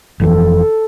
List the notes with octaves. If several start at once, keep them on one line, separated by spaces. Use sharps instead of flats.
F1 F2 E3 A4